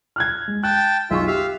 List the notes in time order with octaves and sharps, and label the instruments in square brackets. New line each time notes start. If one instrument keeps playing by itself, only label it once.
[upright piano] F6 F#6 G#6
G#3
[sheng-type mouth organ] G5 A5 [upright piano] F#6
[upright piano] B1 G#4 C#6 [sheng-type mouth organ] F4 E5
[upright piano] G4 [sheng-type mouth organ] E5 F5